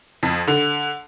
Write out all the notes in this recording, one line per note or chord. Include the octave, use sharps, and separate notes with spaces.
F2
D3